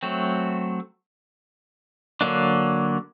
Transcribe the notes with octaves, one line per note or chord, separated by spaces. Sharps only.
F#3 A3 C4
D3 F#3 A#3 D4